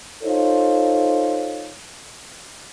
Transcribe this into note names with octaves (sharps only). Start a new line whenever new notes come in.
D#4 F4 A4 C5 C#5